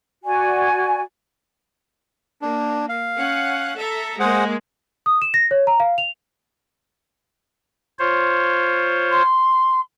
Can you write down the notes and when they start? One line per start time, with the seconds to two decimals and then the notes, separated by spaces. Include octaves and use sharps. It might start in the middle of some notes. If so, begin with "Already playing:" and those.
0.24 F#4 D5 G#5
2.42 A#3 D4
2.89 F5
3.18 C#4 F#5
3.77 A4 E5 A#5
4.20 G#3 A#3 G#4 C5 F#5
5.06 D#6
5.22 E7
5.34 A#6
5.51 C#5
5.67 A#5
5.80 F5
5.98 F7
7.99 F4 C5 C#5
9.11 C6